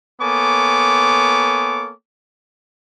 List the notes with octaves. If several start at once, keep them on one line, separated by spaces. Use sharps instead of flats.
A#3 B3 A4 C#5 G#5 D6